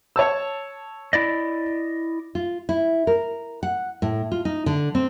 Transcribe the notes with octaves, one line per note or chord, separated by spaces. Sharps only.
C#5 A5 E6
E4 D5 D#5
F4
E4
A#4
F#5
A2
F4
D#4
D3
C4